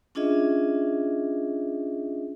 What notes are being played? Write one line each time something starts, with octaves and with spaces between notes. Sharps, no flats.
C#4 D4 F4 G#4 D#5 E5